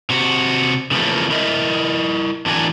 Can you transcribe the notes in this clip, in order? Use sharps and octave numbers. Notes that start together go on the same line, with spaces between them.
C3 F#4
C#3 E3 F3 A3 A#3
E4 A#4 D#5 E5
A2 E3 D4 F#4 A#4 G#5